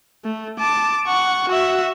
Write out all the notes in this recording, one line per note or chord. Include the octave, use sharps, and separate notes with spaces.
A3
A5 D6
F#5 C#6
F#4 E5